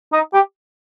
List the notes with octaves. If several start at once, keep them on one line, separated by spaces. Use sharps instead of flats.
D#4
G4